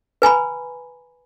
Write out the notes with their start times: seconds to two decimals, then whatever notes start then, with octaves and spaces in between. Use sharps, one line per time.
0.22 B4 G#5 A#5 B5